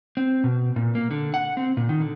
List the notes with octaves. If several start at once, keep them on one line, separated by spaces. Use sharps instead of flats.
C4
B2
A#2
A#3
D3
F#5
C4
A#2
D#3
D3